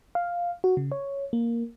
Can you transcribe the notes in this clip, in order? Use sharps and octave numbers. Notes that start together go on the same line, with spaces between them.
F5
F#4
C#3
C#5
A#3